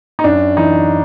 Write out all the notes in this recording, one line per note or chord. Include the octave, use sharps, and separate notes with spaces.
D#4
F#2 D4
E3 D#4